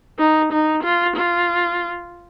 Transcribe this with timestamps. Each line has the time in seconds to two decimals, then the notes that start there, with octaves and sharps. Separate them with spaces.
0.19 D#4
0.52 D#4
0.83 F4
1.16 F4